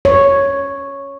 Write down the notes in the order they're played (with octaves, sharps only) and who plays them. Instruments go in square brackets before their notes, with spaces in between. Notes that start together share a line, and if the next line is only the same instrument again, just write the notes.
[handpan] C#5